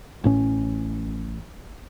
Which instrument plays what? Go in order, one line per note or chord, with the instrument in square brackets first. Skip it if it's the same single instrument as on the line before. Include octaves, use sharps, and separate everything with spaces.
[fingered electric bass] A1 A2 C#4